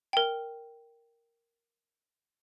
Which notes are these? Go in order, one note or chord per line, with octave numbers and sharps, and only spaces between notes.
A#4 G5